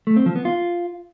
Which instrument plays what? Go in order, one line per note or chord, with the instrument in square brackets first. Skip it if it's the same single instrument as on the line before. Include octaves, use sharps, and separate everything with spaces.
[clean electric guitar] A3
C4
F3
B3
F4